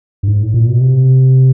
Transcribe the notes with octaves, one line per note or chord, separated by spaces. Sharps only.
G2
G#2
A2
A#2
B2
C3